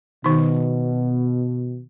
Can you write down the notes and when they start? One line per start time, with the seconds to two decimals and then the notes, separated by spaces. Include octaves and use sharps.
0.24 B2 D#3 D#4